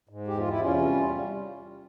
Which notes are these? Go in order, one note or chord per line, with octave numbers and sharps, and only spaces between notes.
G#2
E2 G4
F4
E2 E4
C3 C#4 F4
G3